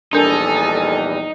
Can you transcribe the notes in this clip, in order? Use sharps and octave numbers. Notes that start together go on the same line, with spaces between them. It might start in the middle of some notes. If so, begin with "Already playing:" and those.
A#1 E2 G3 D4 D#4 A4 A#4 G#5